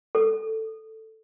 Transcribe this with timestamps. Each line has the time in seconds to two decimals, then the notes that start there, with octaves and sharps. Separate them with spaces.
0.15 A4